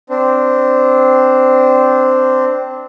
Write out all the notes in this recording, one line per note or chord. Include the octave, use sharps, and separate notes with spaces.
C4 D4